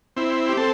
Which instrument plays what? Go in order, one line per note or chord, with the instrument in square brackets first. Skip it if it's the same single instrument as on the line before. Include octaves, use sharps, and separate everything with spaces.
[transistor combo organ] C4 E4
G4
C4 A4